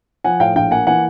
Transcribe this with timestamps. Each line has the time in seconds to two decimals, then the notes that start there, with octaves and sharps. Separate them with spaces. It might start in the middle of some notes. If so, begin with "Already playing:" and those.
0.24 F3 F#5 G#5
0.40 A2 F5 G5
0.56 A#1 F5 G5
0.71 A#3 F#5 G#5
0.87 E3 F#5 G#5